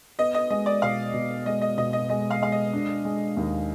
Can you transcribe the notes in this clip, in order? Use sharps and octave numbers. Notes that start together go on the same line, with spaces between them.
B3 D#5
D#5
G#3 D#5
D5
B2 F5
B2
G#3 D#5
D#5
B2 D#5
D#5
G#3 D#5
F5
G#3 F5
D#5
D4
G#3
D#2